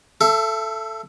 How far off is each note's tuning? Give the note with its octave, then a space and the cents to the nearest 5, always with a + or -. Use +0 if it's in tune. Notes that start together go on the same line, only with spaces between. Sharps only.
A4 +0 E5 +30